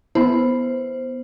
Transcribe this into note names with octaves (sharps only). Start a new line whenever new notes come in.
B3 E4 C5